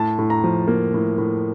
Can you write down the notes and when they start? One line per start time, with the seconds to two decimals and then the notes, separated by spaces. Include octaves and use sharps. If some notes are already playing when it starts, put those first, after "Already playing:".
Already playing: A2 A5
0.18 A2
0.30 A#5
0.44 F3
0.68 A#3
0.94 A2
1.18 A2